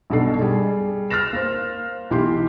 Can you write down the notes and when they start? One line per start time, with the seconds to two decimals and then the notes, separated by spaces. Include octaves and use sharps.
0.10 B1 G2 B2 D4 A4 C7
0.41 G3 G#4
1.10 F6 F#6 A6 A#6 E7
1.33 A#3 C5
2.11 B1 E3 G4 C6